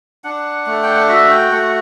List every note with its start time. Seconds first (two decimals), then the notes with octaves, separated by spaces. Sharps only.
0.24 D4 F#5
0.66 A3
0.83 G5
0.96 F#5
1.09 F#4 E5
1.31 G5
1.52 A3 F#5